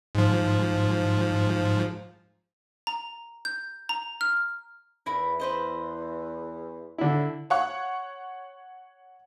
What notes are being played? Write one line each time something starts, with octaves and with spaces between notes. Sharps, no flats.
G#2 F3
A#5
G6
A#5
F6
E2 E3 E4 A#4 B5
B4 C5 D#5
D3 E4
C#5 F#5 C#6